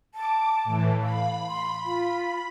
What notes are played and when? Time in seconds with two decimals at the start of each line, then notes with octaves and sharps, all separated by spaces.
0.15 A5 D6
0.64 A2 E3
1.02 F5 B5
1.48 C6
1.86 F4